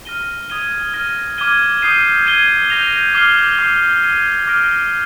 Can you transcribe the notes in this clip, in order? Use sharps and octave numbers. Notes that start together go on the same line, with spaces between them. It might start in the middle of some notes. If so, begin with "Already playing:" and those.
F6 A#6 D#7 G7
D#6 G#6 D#7 G7
F6 A#6 D#7
D6 F6 G#6 D#7 G7
D#6 G6 C7 D#7
G#6 D#7 G7
G6 A#6 F7
D6 F6 C7 G7
D6 G6 C7 G7
G#6 D#7 G7
D6 F6 A#6 D7